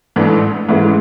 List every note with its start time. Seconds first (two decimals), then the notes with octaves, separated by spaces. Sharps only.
0.16 A1 G#2 E3 A3 D4
0.69 G#2 E3 G#3 C#4 E4